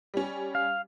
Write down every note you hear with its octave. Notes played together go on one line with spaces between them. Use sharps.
G3 C#4
F5